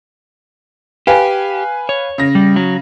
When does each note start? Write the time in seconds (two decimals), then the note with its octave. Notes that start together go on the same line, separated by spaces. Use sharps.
1.07 G4 B4 F5 G#5
1.89 C#5
2.18 C#3 A#6
2.35 G3
2.56 F#3